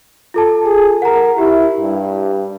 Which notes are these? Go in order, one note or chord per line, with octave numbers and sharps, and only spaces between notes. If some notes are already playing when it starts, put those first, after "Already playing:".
F4 A4 A5
G#4
A#4 F#5 A#5
E4 G4
G2